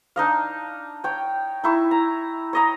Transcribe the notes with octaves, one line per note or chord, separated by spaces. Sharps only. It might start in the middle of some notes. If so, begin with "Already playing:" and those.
D4 D#4 D#5 F5
C#5 G5
D#4 E4 C#6
A#5
C#5 D#5 A#5